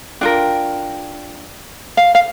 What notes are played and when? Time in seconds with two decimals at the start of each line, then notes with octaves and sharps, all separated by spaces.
0.21 D4 F4 A#4 G5
1.97 F5
2.15 F5